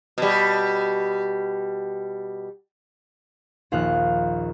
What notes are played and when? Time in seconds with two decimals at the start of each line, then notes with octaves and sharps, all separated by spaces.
0.18 B2 G3
3.72 A#1 D#2 F4 F#6